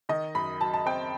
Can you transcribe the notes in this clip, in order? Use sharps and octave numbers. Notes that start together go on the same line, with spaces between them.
D#3 D#5
F#2 B5
F#3 A5
A5
C4 G5